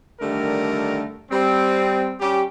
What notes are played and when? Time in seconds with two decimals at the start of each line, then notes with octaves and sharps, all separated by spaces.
0.20 D3 D#3 G3 A3 A#4
1.31 G3 C4
2.20 G3 C#4 G4